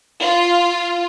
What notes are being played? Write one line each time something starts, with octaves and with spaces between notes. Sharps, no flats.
F4